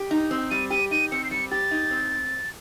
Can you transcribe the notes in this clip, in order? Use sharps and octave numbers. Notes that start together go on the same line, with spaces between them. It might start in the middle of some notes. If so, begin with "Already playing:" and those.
Already playing: G4
D#4
C4
G3 D#7
G4 D#7
D#4 D#7
C4 C#7
C7
G3 C#7
G4 A6
D#4
C4